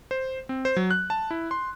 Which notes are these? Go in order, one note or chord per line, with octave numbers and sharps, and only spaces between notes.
C5
C4
C5
F#3
F#6
A5
E4
C6